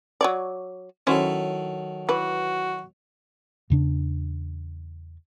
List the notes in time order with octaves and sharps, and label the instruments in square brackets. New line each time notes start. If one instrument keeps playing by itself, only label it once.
[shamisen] F#3 C#5 D5
[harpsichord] D#3 F#3 A4 [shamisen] C#4 E4 C5
[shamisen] E3 B4 [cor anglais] F#4
[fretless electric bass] E2 C#3 D4